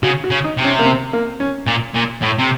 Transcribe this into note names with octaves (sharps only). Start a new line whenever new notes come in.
C#3 F#4
F#4
C#3
D#4
C3
C#4
A#3
C4
A#3
C#4
A#2
A#2
A2
C3